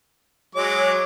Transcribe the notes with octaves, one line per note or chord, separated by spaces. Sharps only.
F#3 G#3 C#5 D6